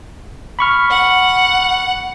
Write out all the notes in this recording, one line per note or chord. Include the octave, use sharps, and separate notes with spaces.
B5 C#6 F6
F#5